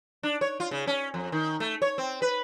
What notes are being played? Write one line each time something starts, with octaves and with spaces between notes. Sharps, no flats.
D4
C#5
F4
C#3
C#4
F2
D#3
A3
C#5
C4
B4